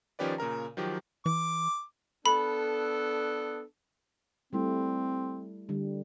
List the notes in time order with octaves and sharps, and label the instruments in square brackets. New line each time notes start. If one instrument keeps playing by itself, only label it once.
[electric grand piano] D#3 F3 C#4 G4 B4 D5
A#2 C#3 A#4 A#5
D#3 F3 F#3 G4
[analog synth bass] E3 [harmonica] D6
[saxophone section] B3 D4 A4 [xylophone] B5
[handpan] G3 A3 E4 [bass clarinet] C4
[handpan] D3 G3